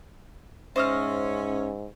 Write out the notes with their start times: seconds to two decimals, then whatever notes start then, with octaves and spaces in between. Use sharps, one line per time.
0.76 G#2 C#4 C5 D#5 E5 C#6 E6 F6